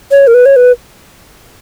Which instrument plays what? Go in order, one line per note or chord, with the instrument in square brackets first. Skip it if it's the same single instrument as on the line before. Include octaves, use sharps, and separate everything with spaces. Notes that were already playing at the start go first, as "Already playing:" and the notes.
[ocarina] C#5
A#4
B4
C#5
B4